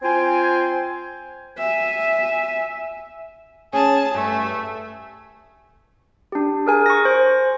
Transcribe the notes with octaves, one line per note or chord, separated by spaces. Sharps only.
C4 F4 G5 G#5
E5 G#5
C#4 G#4 G#5 A5
G2 A3
D4 G4
G#4 A#4 G#5
C#6 A#6
C5